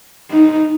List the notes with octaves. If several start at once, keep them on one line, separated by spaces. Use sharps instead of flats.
D#4